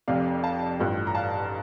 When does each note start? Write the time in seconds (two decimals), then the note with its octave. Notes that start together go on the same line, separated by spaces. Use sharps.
0.08 F1 F2 C3 D5 F5
0.43 F5 A5
0.79 A1 G2 F3 A3
1.07 A#5
1.15 F5 A5